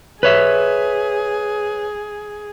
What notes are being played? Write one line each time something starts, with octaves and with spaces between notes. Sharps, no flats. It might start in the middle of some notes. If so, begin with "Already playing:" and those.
G#4 B4 C#5 E5